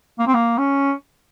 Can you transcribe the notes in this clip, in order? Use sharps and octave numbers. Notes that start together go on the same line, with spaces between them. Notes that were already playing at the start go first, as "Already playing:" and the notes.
A#3
C4
A#3
C#4